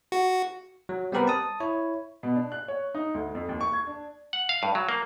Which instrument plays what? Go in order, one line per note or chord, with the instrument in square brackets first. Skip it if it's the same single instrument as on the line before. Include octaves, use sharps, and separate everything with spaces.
[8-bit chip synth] F#4
[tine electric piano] F#3
G3 B3 C4 G4 A#4 B4
A5 D#6
E4 C#5
[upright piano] B2
D4
F#6
C#5
D#4
D2
F2
D#2
C#6
G#6
D4
[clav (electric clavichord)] F#5
F5
G2
F#3
A#3